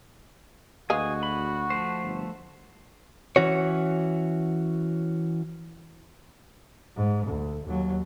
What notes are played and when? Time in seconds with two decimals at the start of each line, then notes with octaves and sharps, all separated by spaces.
0.90 D2 G#3 F#4 B4 F5 G#5 D#6
1.23 B5
1.70 F3 A3 C5
2.02 G1
3.36 E3 C#4 F#4 C#5
6.96 G#2
7.27 D2
7.65 D#2 F#3